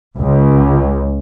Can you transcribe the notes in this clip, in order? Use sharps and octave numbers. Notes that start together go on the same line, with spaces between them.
C#2